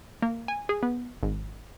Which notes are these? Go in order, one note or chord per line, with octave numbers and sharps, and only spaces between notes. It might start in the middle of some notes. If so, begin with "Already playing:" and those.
A#3
G#5
G#4
B3
G#1